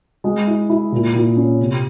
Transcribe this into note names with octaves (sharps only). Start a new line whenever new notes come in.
G#3
E4
E4
A#2
A#2
C#4
C3